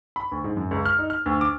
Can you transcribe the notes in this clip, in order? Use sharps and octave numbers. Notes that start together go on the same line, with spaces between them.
B5
D2
G#2
F#2
C#2
F6
D#4
F6
D2
D6